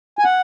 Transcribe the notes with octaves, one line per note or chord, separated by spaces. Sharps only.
G#5
F#5